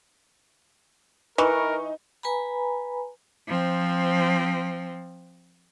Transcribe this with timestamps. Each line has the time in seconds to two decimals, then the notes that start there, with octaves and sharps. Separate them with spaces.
1.38 E3 D#4 A#4 B4 C#6
2.23 B4 G#5 A#5 B5
3.48 F3 C4